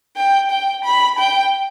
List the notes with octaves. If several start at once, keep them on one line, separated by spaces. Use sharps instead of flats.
G5
G5
B5
G5